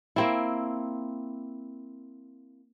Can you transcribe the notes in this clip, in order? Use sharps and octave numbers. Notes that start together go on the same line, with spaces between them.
A#3 C4 E4